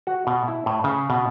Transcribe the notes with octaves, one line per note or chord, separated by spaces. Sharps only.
F#4
B2
E4
A2
C#3
B2